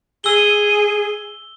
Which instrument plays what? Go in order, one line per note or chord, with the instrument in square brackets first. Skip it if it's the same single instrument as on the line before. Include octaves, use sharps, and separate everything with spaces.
[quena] G#4 [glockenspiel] E6 G7